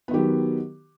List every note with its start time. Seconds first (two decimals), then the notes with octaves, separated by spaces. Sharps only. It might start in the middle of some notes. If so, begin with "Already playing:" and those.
0.08 B3
0.11 D#3
0.14 G4
0.17 F#3